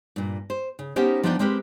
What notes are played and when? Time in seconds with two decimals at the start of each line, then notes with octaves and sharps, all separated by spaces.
0.16 G2 A#2
0.50 C5
0.79 C#3
0.96 B3 C#4 D#4 G4 A#4 C5
1.23 F3 B3 D4 D#4 E5 G5
1.39 G#3 C4 G4 A#4 B4